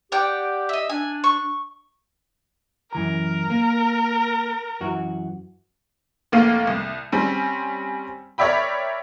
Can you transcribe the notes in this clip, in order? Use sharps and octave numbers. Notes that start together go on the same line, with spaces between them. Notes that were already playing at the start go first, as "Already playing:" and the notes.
G4 D5 F#5 G5
D#5 E5
D4 G#5
C#6
F#2 E3 A#4 A#5
A#3
F#2 E3 F#4
F1 A3 A#3 F5 C7 D#7
C2
G3 C4 C#4
A#4 C#5 D5 E5 G5 B5